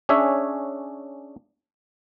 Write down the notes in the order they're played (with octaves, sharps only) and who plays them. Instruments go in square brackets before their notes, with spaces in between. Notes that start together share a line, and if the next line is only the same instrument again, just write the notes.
[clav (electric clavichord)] C#4 D4 G#4 C#5 E5